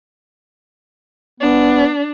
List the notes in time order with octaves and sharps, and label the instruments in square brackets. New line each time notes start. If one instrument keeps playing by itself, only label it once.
[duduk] B3 [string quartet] D4